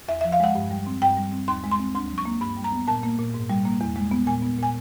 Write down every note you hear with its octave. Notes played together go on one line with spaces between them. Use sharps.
E2 E5
F3 E5
F5
G#3 F#5
G2
G3
C4
G2 G5
G3
C4
D#2 C6
G#3
C6
C4
D2 C6
F#3
C#6
A#3
G2 B5
G3
A#5
B3
A#2 A5
A#3
A#2
G#2
G3
A#3
E2
G#3
B3
A#2 G#5
B3
A#2 G#5